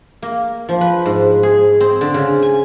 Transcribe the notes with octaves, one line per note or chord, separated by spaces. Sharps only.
A#3
F3
B4
G#2
G#4
C4
D3
C#3
G#5